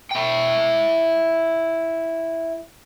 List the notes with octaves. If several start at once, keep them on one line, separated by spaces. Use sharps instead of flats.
E4 G5